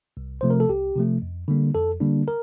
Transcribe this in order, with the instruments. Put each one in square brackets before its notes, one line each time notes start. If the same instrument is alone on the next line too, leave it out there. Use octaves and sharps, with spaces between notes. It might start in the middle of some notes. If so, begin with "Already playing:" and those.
[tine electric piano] C2
C3 F3 A3 C5
A#4
A4
C2 G4
C3 F3 A3
F2
D3 G3 A#3 D4
F2 A4
D3 G3 A#3 D4
A#4